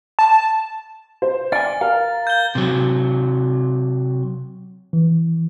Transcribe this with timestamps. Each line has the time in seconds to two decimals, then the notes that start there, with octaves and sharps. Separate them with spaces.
0.19 A5
1.22 C5
1.52 D5 G#5 F6 A6
1.81 A#4 F5
2.27 G6 G7
2.55 C3 F#3
4.93 E3